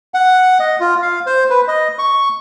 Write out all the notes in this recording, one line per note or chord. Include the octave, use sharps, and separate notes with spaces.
F#5
D#5
F4
F5
C5
B4
D#5
C#6